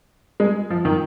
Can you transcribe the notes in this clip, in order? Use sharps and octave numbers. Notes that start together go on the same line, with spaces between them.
G#3
F3
D#3